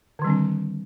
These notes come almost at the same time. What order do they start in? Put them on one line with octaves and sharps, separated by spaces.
D3 D#3 G3 C4 D4